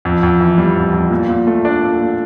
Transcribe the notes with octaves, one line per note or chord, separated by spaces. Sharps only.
F2
F2
E3
G3
F2
F2
A#2
A#2
A3
D4 D5
A#2
A#2